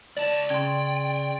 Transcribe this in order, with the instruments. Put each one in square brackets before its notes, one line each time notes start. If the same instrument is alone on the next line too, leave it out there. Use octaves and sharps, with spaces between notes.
[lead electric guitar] C#2 A5 [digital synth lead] D5
[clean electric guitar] C#3 [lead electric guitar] G5 [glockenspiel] C6 G#6